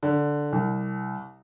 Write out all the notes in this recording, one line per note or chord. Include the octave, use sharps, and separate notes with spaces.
D3
C2